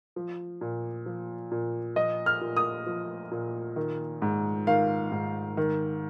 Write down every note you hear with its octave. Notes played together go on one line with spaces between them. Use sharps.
F3
A#2
F3
A#2
F3 D#5
F6
A#2
D#6
F3
A#2
D#3
G#2
D#3 F5
G#2
D#3